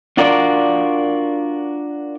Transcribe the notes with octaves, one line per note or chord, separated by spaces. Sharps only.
D4 F4 F#4 A#4 D5